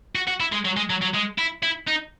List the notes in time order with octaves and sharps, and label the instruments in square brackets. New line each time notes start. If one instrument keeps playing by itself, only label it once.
[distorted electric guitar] F#4
F#4
E4
G#3
F#3
G#3
F#3
F#3
G#3
E4
E4
D#4